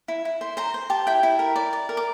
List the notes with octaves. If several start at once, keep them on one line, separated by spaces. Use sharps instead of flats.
E4
E4
C5
C5 A#5
C5
G4 A5
E4 G5
E4
A#4
D5
D5
A#4
D6